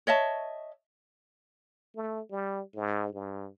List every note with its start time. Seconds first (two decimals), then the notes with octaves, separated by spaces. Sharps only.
0.07 C#5 D#5 E5 A5
1.95 A3
2.31 G3
2.75 G#2
3.13 G2